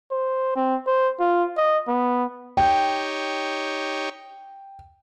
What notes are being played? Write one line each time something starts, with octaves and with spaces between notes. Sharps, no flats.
C5
C4
C5
F4
D#5
B3
D#4 G4 C#5 G5